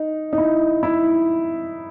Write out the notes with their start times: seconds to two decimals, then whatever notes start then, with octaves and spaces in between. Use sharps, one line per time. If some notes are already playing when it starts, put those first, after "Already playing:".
Already playing: D#4
0.33 D#4
0.38 E4
0.83 E4